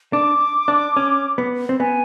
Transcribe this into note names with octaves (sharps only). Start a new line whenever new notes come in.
D4 D6
D4
C#4
B3
C4
B3 G#5